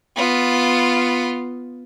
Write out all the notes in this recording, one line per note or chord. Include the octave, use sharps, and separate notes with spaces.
B3 F4